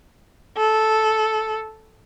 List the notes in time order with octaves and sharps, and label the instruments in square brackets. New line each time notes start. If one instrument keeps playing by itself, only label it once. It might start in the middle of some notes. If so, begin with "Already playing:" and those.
[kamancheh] A4